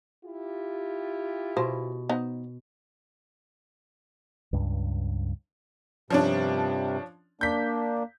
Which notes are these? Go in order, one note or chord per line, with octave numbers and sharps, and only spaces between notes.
E4 F4 G4
B2 C5
B3 D#4 C5
C#2 G2
G2 C3 F3 C#4 D4
A#3 D4 G6 B6